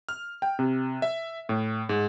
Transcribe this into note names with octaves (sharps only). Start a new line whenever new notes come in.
F6
G5
C3
E5
A2
G#2